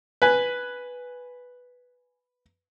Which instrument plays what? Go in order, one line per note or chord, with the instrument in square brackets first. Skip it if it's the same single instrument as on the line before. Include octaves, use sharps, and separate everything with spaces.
[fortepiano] B4 G#5